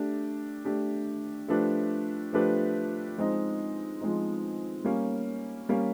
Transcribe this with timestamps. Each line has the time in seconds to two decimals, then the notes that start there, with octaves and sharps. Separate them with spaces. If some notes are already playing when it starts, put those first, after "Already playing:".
Already playing: A3 D4 G4
0.65 A3 D4 G4
1.48 F3 A3 D4 G4 B4
2.33 F3 A3 D4 G4 B4
3.16 F3 G#3 C4 D#4
4.01 F3 G#3 C4 D#4
4.84 G3 A#3 C#4
5.69 G3 A#3 C#4